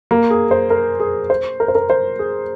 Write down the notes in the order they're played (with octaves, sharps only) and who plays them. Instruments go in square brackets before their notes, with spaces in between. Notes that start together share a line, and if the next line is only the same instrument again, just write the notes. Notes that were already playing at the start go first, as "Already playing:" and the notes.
[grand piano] A#3
G#4
C5
A#4
G#4
C5
A#4
C5
A#4
C5
G#4